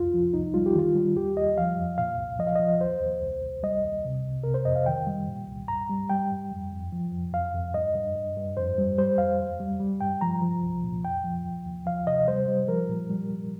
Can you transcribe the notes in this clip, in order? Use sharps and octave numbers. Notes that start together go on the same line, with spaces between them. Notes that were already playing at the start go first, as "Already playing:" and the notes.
Already playing: C2 F2 F4
F3
C2 D#4
G3 F4
G4
D#3 F4
G3
D#2 G4
D#2 D#5
F3 F5
F2
A#2 F5
C2
F3 D#5
F5
F3 D#5
D#2 C5
D#2
C2
C2
G3 D#5
D#2
C3
C2
C3 A#4
C5
F2 D#5
F5
D#3 G5
G3
A#2
C2
G2 A#5
G3
G3 G5
G2
F2
F2
F3
F2
F2 F5
F2
G2 D#5
G2
G2
G2
F2 C5
G3
G3 C5
F2 F5
D#2
G3
G3
G2 G5
F3 A#5
F3
C2
A#2
F2 G5
F3
D#2
D#2
F3 F5
C3 D#5
G3 C5
G3
F3 A#4
A#2
G3
G3